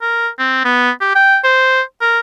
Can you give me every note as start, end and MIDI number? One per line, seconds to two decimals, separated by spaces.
0.02 0.29 70
0.39 0.63 60
0.65 0.91 59
1.01 1.12 67
1.16 1.38 79
1.44 1.82 72
2.01 2.20 70